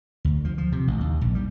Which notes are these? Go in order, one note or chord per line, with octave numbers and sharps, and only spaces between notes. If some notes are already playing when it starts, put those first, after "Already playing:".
D2
F3
F3
C3
A1
D#2
A#1
G3